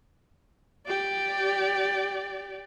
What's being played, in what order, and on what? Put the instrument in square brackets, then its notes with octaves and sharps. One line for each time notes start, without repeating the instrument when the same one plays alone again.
[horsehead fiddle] G4 D5